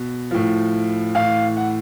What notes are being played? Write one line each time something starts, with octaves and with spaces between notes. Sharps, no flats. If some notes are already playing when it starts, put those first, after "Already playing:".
Already playing: B2
A2 F3
A2 E3 F5
F#5